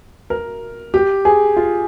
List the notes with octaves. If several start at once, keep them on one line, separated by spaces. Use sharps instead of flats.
A#4
G4
G#4
F4